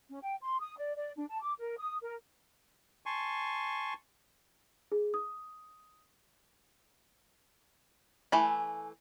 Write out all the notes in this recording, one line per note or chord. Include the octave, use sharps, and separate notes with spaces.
C#4
G5
C6
D#6
D5
D5
D4
A5
D6
A#4
D#6
A#4
G#5 A5 C6 C#6
G#4
D#6
E3 A3 G#5 B5